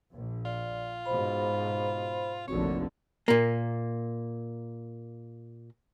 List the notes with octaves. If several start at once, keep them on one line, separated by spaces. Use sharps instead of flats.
A#1
F4 D5
G#2 B2 C5 B5
F1 A#1 D3 C4 D#4 F#4 C#5
A#2 A#3